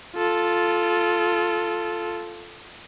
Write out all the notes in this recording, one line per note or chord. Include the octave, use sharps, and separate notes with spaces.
F4 A4